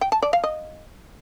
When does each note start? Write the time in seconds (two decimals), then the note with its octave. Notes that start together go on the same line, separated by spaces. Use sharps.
0.01 G5
0.12 A5
0.22 D5
0.33 F5
0.44 D#5